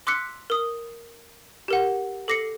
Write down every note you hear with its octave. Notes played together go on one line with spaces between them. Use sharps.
C6 D6 E6 F#6 B6 C#7
A#4 D#6
G4 A#4 F#5
A4 D6 A#6 C7 C#7